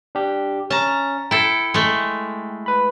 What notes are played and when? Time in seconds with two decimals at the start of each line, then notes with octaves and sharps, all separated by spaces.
0.15 D4 G4
0.70 C#4 A5 A#5
1.31 E4 A4 G5
1.74 G#3 A3
2.66 B4 B5